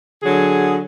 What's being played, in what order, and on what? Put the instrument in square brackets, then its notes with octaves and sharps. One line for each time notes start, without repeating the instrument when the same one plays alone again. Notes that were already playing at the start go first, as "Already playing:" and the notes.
[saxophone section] D3 F#3 G#4